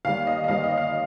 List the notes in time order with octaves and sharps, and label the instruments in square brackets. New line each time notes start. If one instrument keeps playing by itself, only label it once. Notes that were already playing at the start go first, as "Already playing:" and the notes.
[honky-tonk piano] D#2 D#3 G3 A#3 F5
D#5
D#5
D#2 D#3 G3 A#3 F5
D#5
F5